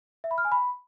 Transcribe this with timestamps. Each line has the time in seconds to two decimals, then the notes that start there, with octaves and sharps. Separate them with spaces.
0.24 E5
0.31 B5
0.38 F6
0.45 G#5
0.52 B5